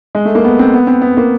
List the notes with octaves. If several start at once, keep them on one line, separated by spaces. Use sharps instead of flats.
G#3
A3
A#3
B3
C4
B3
C4
B3
A#3